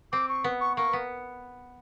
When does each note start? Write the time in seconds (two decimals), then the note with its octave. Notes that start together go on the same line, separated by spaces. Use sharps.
0.12 C4 D6
0.29 C#6
0.44 B3
0.61 C#6
0.77 A#3 C#6
0.93 B3